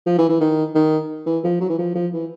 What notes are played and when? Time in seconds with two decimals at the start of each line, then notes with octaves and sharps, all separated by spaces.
0.06 F3
0.18 E3
0.29 E3
0.40 D#3
0.75 D#3
1.26 E3
1.44 F3
1.61 F#3
1.69 E3
1.79 F3
1.95 F3
2.13 E3